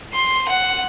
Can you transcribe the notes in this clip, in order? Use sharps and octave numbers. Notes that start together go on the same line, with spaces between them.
C6
F#5